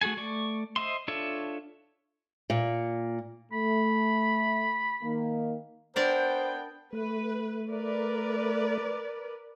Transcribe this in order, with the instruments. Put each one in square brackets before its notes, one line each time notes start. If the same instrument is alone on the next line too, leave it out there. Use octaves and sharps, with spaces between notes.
[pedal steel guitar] A3 F#4 G#4 A4 G#5
A3 D5 C#6
C5 D#5 E5 C6
D4 F4 A4 C#5 E5
[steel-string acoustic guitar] A#2
[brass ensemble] A3 [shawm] B5
[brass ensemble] D#3 A#3
[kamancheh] B3 G5 [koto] D4 A#4 D5 [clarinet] C5
[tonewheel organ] A3 [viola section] B4
[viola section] A#4 B4 D5